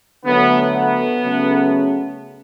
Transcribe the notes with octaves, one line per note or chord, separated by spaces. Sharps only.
D3 F#3 A3 B3
B3
C#3 F#3 A3